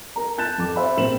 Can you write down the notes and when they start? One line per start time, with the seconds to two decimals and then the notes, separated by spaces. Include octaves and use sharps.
0.16 A#4 A#5
0.38 A5 F#6 G6 A6 E7
0.58 F2 D6
0.75 C5 E5 B5 C6
0.97 A#1 C4 A#4 E7 F#7